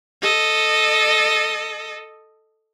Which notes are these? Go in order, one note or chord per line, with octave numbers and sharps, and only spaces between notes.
A4 D#5